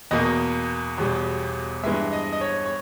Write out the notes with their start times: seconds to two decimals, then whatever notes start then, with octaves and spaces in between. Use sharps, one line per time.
0.11 E2 B2 A#3 D#5
0.97 E1 E2 B2 G3
1.83 G2 E3 G#3 E5
2.13 D#5
2.33 D#5
2.41 C#5
2.66 C#5